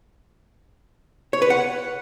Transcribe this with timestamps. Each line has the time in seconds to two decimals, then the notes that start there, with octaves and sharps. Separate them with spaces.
1.33 C#5
1.42 B4
1.50 F#5